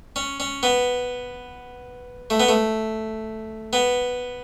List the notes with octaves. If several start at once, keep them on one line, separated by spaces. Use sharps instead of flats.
C#4
C#4
B3
A3
B3
A3
B3